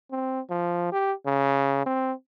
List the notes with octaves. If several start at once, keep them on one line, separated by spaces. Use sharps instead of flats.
C4
F3
G4
C#3
C4